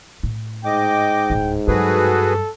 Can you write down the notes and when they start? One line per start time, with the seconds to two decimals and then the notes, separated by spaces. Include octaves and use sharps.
0.23 A2
0.65 G#2 D#5 G5 D6
1.30 D1 E4
1.68 G2 F#3 F#4 G#4 A4 B4